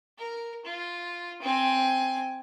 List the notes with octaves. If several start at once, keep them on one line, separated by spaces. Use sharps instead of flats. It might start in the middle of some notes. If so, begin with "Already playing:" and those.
A#4
F4
C4 G#5